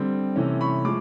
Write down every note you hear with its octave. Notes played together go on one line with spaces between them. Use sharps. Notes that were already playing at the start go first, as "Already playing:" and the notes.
Already playing: D3 G3 C4
C3 E3 A3 C#4
B5 C#6
F3 G#3 D6